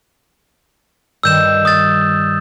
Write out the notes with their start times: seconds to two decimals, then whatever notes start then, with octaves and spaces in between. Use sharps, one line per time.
1.23 G2 D#3 G3 E6 G6 E7
1.65 D#6 A6